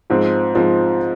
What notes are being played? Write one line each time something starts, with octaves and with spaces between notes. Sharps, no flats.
G#2 F3 C4
G#2 F3 C4